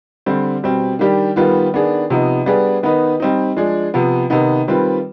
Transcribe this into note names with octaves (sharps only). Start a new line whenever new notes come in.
D3 G3 C4
B2 G3 C4
D#3 G3 D4 G4
D#3 G3 B3 F4 B4
D#3 B3 D4 G#4
C3 F3 B3 D#4
G3 B3 D4 G#4 B4
D#3 B3 D#4 B4
G3 C4 D#4
F3 G#3 D4 G#4
C3 F3 B3
C3 D#3 B3 D#4
D#3 G3 C4 F4 B4